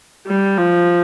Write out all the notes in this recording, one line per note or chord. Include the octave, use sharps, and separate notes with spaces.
G3
F3